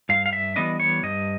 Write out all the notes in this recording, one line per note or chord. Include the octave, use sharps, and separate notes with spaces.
G2 F5
F5
E5
E3 G3 B3 D4 D#5
C#5
G2 D#5